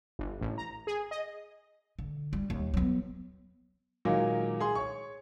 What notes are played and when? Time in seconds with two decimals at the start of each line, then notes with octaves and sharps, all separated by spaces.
0.19 G1
0.41 A1
0.58 A#5
0.87 G#4
1.11 D#5
1.99 D3
2.33 G3
2.50 D#2
2.74 F#3 B3
4.05 A#2 D#3 F#3 G#3 A#3
4.60 G#4 C6
4.75 C#5 C#6